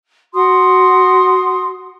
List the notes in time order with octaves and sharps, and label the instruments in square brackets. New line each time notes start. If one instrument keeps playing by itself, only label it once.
[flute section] F#4 C6 D#6